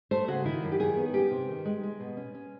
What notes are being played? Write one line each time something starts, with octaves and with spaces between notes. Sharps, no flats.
A3 C5
C#3 F#4
D#3 E4
F#2
G4
D#3 G#4
B3
C#4 G4
C3
D#3
G#3
G#3
B2
C#4
C#4